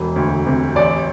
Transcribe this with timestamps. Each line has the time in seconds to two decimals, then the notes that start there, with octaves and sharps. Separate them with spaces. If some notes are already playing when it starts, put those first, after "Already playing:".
Already playing: E1 E3
0.16 D2
0.46 C3
0.75 A1 D5